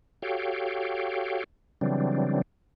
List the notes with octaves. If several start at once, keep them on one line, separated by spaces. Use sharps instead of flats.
F#4 G4 A4 C#5 F5 G5
C#3 E3 F#3 G3 C4 D4